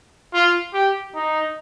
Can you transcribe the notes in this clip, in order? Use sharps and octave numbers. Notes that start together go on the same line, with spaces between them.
F4
G4
D#4